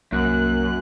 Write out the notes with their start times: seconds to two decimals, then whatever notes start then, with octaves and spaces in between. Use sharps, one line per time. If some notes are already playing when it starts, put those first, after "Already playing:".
0.13 C2 F#2 A#3 F#6